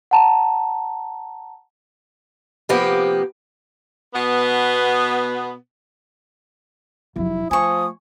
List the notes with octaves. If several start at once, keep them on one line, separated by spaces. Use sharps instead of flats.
F#5 A5 A#5
C3 F3 A#3 B3 G4
B2 B3
F1 F#3 E4
F3 A3 G#5 C#6 D#6